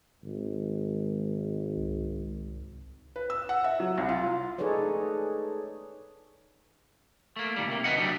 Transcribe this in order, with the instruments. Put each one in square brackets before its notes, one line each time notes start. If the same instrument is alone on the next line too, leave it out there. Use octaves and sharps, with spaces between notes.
[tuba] G#1
[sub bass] C2
[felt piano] B4
E6
F#5
E5
F#3
C2
F4
[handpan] D#4 G#4 A4 B4 C#5 D5
[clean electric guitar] A3 A#3
A#2 D#3 G3
C3 A#3
F#2 B4 D#5 F#5
D3 F#3 G3 A3 D4 D#4